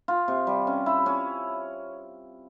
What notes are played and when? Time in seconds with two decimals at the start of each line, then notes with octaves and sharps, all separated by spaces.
0.08 F4
0.28 C3
0.47 G3
0.67 C#4
0.86 E4
1.06 C#4